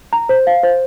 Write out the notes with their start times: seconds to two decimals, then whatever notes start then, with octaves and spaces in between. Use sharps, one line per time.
0.13 A#5
0.29 C5
0.47 F5
0.63 C5